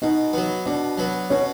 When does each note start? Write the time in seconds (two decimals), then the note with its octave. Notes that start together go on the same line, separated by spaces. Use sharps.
0.02 B2 D#4
0.33 F#3 B3
0.66 B2 D4
0.98 F#3 B3
1.30 B2 C#4